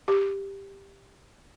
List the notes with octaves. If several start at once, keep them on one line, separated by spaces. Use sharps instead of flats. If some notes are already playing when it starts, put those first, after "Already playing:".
G4